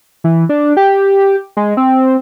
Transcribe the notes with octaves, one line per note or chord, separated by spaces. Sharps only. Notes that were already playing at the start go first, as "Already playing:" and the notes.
E3
D4
G4
G#3
C4